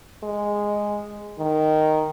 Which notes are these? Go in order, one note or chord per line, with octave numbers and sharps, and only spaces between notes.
G#3
D#3